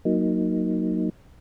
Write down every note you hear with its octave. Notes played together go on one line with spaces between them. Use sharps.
F#3 A#3 D#4